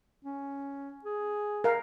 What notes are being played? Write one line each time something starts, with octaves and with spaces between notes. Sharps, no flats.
C#4
G#4
A#4 F5